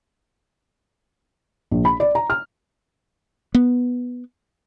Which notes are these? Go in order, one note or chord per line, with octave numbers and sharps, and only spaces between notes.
A#1
B5
D5
A#5
F6
B3